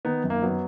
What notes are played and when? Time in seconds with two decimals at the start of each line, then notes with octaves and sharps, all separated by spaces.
0.05 D#3 B3 D#4
0.24 F#2
0.30 A#3
0.43 F#3 B3